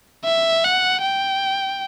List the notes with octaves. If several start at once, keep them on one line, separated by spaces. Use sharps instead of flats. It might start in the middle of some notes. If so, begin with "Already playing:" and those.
E5
F#5
G5